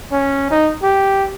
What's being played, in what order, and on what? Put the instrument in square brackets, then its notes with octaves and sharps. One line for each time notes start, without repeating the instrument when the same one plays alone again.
[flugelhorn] C#4
D#4
G4